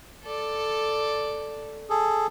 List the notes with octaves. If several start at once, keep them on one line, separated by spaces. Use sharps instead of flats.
A4 D5
G#4 A4